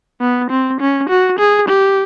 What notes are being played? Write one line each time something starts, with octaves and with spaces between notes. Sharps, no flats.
B3
C4
C#4
F#4
G#4
G4